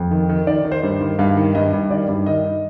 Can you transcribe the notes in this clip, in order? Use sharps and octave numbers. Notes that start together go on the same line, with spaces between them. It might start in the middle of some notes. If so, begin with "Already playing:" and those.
Already playing: F2
D#3
D#3
D#3 D5
D#3
C5
G2
D#3
G2 F5
D#3
G2 D#5
G2
D#3 D5
G2
D#3 D#5